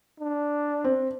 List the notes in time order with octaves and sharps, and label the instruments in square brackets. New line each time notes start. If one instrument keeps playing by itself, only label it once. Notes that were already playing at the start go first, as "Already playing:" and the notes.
[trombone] D4
[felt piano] C4